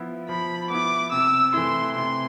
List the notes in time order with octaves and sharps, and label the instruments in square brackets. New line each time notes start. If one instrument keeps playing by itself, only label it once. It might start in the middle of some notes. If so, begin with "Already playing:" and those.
Already playing: [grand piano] F3 B3 E4
[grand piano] F3 [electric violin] B5
[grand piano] B3 E4 [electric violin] D6
[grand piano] C3 [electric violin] E6
[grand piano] E3 A3 E4 [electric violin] C6
[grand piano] C3 [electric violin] C6